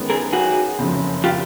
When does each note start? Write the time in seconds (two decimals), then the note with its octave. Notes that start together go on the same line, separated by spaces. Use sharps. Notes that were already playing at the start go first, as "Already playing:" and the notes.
Already playing: F#2 D#3 G#3 B3
0.10 G#4 A#4
0.33 F#4 G#4
0.79 F#1 F2 C#3 F3 G#3
1.24 F4 G4